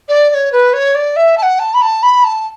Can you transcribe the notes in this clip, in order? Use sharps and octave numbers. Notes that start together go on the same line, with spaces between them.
D5
D5
C#5
B4
C#5
D5
E5
A5
F#5
A5
B5
A5
B5
A5